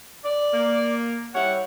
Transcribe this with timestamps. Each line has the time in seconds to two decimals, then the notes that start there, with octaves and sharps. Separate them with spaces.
0.25 D5
0.54 A#3
1.35 G3 E4 C#5 F#5